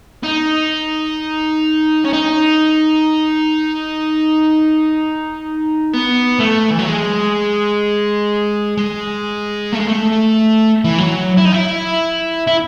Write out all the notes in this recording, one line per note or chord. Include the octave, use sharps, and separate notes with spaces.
D#4
C#4
D#4
B3
A3
E3
F#3
G#3
G#3
A3
G#3
A3
E3
F#3
E4
D#4
E4
E4